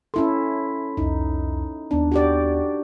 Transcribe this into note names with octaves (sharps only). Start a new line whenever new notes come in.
C#4 E4 A4 C6
C2 F2 D#4
D#2 B3 D4
F#4 G4 D5